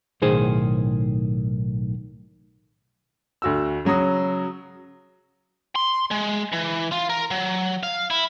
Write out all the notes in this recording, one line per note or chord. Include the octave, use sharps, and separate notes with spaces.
B1 A2 D#3 G#4 C5
D2 F#4 E6
C#3 F#3 F#4 D#6
C6
G#3
E3
F4
A#4
F#3
F5
E4